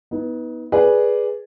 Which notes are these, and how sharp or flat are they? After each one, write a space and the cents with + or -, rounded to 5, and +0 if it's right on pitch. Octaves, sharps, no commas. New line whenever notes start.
B3 -10 D#4 +35
G#4 +0 B4 -10 D5 +0